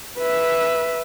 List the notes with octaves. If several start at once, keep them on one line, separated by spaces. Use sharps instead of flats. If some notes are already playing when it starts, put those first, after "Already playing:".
B4 E5